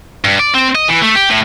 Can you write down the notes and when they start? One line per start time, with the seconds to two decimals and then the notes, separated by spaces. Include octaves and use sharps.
0.24 G2
0.39 D5
0.54 C4
0.75 D#5
0.89 E3
1.03 A3
1.16 G4
1.30 A2